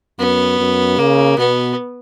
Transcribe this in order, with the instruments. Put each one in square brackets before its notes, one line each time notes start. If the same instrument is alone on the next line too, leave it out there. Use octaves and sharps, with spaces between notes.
[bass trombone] F#2 [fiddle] B3
[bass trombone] F#2
[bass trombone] C#3 [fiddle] A#3
[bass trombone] B2 [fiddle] B3